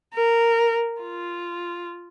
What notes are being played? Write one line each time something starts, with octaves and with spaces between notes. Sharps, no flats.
A#4
F4